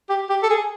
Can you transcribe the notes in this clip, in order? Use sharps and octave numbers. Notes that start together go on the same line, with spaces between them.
G4
G4
A4
G#4